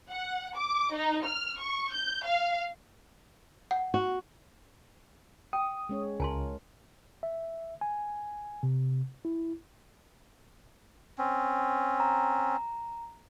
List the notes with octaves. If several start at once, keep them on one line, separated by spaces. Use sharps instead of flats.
F#5
D6
D#4
F6
C#6
G6
F5
F#5
F#4
G5 D#6
G#3 C#4 C#5
C#2 F4 A#4 G#5 A5 C6
E5
G#5
C3
E4
C4 C#4
A#5